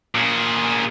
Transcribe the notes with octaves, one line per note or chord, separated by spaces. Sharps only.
A#2 G#4